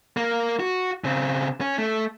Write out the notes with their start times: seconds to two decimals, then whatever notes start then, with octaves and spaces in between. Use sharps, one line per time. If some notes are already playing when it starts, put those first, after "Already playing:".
0.17 A#3
0.60 F#4
1.04 C#3 C4
1.61 C#4
1.78 A3